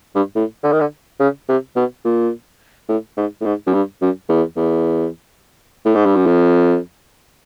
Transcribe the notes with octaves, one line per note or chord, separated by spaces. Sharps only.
G2
A2
D3
D#3
D3
C#3
C3
B2
A#2
A2
G#2
A2
G#2
F#2
G2
F#2
E2
E2
A2
G#2
G2
F#2
F2